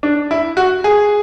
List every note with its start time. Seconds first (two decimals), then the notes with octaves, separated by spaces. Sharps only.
0.03 D4
0.31 E4
0.57 F#4
0.84 G#4